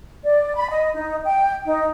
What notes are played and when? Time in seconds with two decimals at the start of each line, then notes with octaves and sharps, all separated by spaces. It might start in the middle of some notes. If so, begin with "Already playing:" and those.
0.25 D5
0.56 B5
0.70 D#5
0.95 D#4
1.24 G5
1.65 D#4